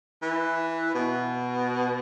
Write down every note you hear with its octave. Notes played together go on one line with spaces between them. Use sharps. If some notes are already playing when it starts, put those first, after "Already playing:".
E3
B2